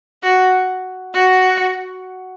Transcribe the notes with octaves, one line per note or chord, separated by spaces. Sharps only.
F#4
F#4